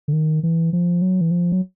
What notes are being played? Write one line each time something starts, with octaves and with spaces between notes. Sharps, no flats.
D3
D#3
E3
F3
F#3
E3
F3
F#3